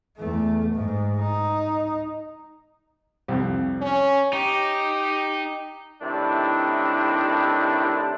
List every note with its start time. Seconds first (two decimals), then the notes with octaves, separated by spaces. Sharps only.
0.19 E2 A3
0.73 G#2
1.20 D#4
3.28 C2 F2
3.81 C#4
4.33 D#4 G4
6.02 A2 C3 D#3 D4 E4